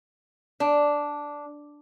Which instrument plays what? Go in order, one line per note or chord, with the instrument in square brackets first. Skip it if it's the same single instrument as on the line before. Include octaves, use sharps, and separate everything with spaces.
[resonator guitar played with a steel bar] D4